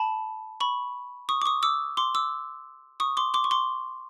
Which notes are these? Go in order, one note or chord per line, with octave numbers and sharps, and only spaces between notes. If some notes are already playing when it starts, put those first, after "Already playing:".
Already playing: A5 B5
B5 C#6
C#6 D#6
D6
C#6 D#6
D6 E6
C6 D6
D6 E6
C#6 D#6
C6 D6
C6 D6
C#6
C6 D6